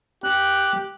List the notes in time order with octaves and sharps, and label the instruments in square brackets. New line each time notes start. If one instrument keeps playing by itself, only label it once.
[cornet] G4 [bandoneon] F#6